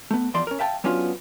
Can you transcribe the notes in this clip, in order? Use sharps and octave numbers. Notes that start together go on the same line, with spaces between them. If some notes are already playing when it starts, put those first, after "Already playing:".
A3 B3
E2 F3 D5 C6
C#4 A#4
E5 F5 G5 A5
F#3 B3 C#4 D4 F4